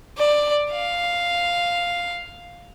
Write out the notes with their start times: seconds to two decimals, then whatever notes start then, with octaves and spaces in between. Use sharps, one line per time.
0.17 D5
0.71 F5